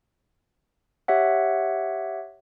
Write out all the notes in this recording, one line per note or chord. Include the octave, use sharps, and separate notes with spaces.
G4 C#5 E5 F#5